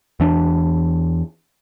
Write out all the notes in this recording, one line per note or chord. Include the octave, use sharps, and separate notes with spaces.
E2 E3 D4